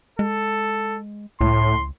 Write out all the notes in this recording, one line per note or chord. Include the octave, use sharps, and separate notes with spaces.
G#3 A4
C#2 A2 C6